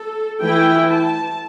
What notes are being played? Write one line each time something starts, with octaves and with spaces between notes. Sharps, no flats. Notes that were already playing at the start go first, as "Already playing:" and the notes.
Already playing: A4
E3 A3 E4 G5
A5